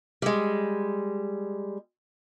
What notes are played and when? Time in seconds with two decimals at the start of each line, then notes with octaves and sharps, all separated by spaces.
0.22 G3 G#3